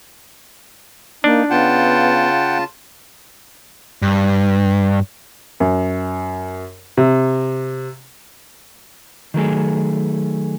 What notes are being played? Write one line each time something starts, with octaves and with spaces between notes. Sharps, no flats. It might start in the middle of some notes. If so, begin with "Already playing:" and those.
A#3 D4 D#4
C#3 B3 F4 F#5 G5 A5
G2
F#2
C3
D#3 F#3 A3 G#4